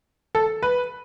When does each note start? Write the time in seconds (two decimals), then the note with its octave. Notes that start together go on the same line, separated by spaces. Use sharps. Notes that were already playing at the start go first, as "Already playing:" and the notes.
0.35 A4
0.63 B4